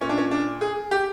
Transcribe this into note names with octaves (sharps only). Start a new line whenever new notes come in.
A#2 C#4
D4
C#4
D4
G#4
G4